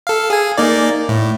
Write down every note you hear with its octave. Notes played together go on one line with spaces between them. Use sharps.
A4 F5
G#4 G#5
A#3 D#4 D5
A2